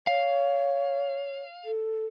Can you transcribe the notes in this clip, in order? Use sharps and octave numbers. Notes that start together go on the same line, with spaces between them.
C#5 F5
A4